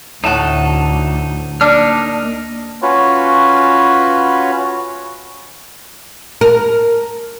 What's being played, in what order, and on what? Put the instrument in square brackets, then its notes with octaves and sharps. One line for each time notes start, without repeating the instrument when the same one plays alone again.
[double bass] D2 [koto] A2 F#4 [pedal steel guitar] D#4 A5
[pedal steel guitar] A#3 D#4 F6 [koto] D4
[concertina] C#4 F4 F#4 B4 C#5
[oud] A#4